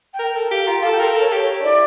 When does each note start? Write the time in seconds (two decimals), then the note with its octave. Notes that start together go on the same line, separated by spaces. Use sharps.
0.14 G5
0.19 A#4
0.35 A4 G5
0.51 G4 F5
0.67 F4 A#5
0.83 A4 F5
0.92 G5
0.99 A#4 F5
1.16 A4 C#5
1.32 G4
1.43 C#5
1.60 D4
1.64 E4 D5